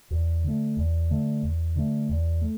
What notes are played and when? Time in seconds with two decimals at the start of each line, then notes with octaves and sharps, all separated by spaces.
0.11 E2
0.44 D3 A3
0.77 E2
1.10 D3 A3
1.43 E2
1.76 D3 A3
2.09 E2
2.41 A3